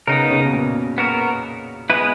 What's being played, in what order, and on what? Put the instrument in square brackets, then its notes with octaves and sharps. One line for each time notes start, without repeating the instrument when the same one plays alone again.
[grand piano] C#3 [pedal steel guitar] B3 D#4 A#4
[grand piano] C#3
B2
A#2
[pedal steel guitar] B3 F#4 A#4
G#3 B3 E4 B4